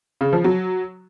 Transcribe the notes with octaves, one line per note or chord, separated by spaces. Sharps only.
C#3
F3
F#3